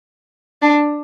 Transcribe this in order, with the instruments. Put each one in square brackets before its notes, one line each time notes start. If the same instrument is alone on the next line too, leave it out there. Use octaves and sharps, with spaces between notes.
[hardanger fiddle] D4